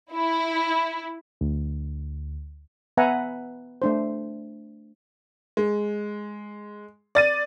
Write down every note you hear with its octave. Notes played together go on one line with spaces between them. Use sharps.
E4
D2
B3 B4 E5 F#5 G#5 A#5
A3 D4 C5
G#3
D5 A6 D#7